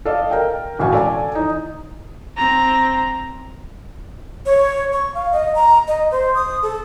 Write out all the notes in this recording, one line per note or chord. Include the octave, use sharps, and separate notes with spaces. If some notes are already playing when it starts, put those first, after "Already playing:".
A4 D5 D#5 F5
A#4 G5
E1 A1 F#4 F5 G5 G#5
A4 D5 G#5
E3 D#4
C4 A#5
C#5
C#6
F5
D#5
A#5
D#5
C5
D#6
A4